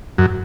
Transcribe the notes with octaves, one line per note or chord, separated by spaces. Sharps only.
F#2